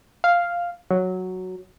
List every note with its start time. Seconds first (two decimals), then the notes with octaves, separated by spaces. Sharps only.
0.24 F5
0.90 F#3